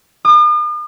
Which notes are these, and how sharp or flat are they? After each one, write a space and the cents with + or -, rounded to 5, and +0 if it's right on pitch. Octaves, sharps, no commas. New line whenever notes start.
D#6 -45